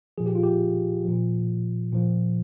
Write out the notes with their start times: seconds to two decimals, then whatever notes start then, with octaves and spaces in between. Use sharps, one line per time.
0.18 A#2 F3 G#4
0.26 G4
0.35 F4
0.43 G4
1.05 A#2 F3
1.93 A#2 F3